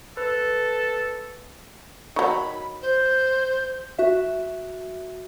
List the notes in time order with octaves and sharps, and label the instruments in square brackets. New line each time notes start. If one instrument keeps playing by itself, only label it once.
[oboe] A4 [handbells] B4
[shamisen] D#3 F#3 [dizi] B5
[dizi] C5
[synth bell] F#4 E5